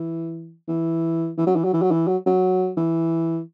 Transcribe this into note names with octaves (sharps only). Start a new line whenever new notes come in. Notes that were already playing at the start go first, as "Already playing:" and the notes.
Already playing: E3
E3
E3
F#3
E3
F#3
E3
F#3
E3
F#3
F#3
E3